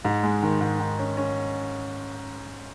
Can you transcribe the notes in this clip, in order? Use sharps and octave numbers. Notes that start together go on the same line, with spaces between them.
G#2
G#3
D#3
G#2
D#3
C#4
C#4